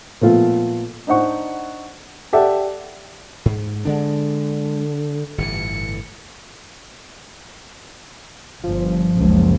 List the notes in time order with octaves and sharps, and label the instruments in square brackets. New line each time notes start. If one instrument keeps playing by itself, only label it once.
[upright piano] A#2 F3 A3 B3 F4
D4 D#4 C5 F#5 C#6
G4 A4 D5 E5 F#5 A5
[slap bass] G#2
[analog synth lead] D3 [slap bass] G#3 B3 D4
[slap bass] G1 A2 E3 [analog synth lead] C#7
[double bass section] G1 [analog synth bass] F3
[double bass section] F#1 C#2